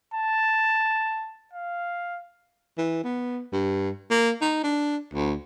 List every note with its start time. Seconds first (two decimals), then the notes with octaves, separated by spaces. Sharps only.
0.14 A5
1.53 F5
2.78 E3
3.04 B3
3.52 G2
4.10 A#3
4.41 D#4
4.64 D4
5.14 D2